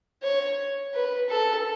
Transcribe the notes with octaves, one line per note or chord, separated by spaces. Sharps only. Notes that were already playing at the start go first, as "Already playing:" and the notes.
C#5
B4
A4